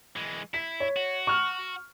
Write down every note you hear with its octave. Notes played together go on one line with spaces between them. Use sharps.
E3 G#3
E4 B6
C#5
F#4
C#6 F6